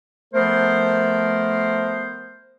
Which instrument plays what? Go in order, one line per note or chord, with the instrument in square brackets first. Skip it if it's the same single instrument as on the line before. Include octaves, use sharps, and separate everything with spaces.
[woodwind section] F3 A3 B3 A#4 C5